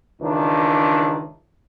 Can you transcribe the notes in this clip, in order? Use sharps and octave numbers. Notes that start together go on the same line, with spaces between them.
C#2 D#3 E3 D4